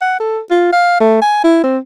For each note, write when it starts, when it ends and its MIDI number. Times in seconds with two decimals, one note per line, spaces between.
0.01 0.16 78
0.20 0.40 69
0.51 0.68 65
0.72 1.00 77
1.00 1.19 57
1.22 1.42 80
1.44 1.59 64
1.64 1.78 60